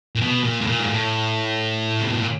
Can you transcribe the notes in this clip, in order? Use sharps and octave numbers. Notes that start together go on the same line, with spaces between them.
A#2
B2
A#2
A2
A#2
G#2
A2
C3
B2
A#2